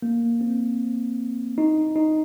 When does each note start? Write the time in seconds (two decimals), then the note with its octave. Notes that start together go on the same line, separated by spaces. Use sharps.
0.02 A#3
0.41 C4
1.58 D#4
1.96 D#4